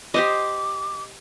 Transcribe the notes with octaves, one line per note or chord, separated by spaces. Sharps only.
G4 C5 D#5 D6